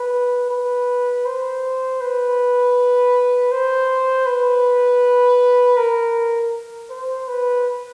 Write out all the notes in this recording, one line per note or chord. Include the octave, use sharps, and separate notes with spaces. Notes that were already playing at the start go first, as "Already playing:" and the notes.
Already playing: B4
B4
C5
B4
C5
B4
A#4
C5
B4